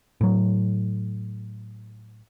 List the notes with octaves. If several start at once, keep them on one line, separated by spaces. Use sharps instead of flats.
A2 F#3